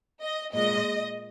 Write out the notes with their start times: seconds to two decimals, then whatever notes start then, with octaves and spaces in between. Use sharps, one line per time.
0.21 D#5
0.54 A#2 G#3 D#5